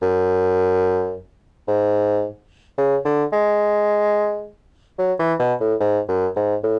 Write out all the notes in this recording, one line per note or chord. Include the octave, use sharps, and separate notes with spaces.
F#2
G#2
C#3
D3
G#3
F#3
E3
B2
A2
G#2
F#2
G#2
A2